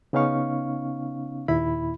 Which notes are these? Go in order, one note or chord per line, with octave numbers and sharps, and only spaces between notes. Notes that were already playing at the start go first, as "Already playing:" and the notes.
C#3 B3 C#4 D#4 F5 C#6
D#2 A#2 E4 B5